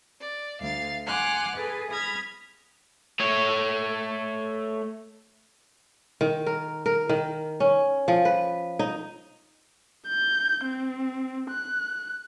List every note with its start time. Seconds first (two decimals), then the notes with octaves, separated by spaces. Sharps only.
0.20 D5
0.59 D2 F5 A6
1.06 F#5 G#5 C6 D6 F6 F#6
1.56 G#4 A4 B4
1.90 B5 D#6 F6 G#6 A#6
3.20 A3 C#5
6.21 D#3
6.46 A#4
6.86 A#4
7.09 D#3
7.60 C#4
8.08 F3
8.25 B4
8.79 D#4
10.08 G6
10.65 C4
11.50 F#6